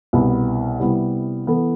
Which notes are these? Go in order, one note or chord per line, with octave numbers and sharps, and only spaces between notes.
C2 B2 B3
C3 G3 B3 E4
E3 B3 E4 A4